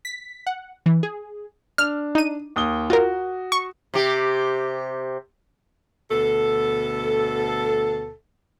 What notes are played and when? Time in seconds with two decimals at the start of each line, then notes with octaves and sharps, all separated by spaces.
0.05 B6
0.47 F#5
0.86 E3
1.03 G#4
1.78 D4 F6
2.15 D#4 D#7
2.56 D#2 D#6 G7
2.90 F4 F#4 A#4
3.52 C#6
3.94 C3 G4
6.11 D2 B2 A4